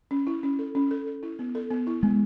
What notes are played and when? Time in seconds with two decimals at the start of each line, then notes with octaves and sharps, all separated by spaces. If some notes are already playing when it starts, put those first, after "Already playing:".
0.11 C#4
0.27 E4
0.43 C#4
0.59 A4
0.75 C#4
0.91 A4
1.07 A4
1.23 E4
1.39 B3
1.55 A4
1.71 B3
1.87 E4
2.03 G#3 B3